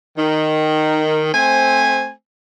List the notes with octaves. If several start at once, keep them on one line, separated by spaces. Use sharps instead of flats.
D#3
A3 C4 C5 G#5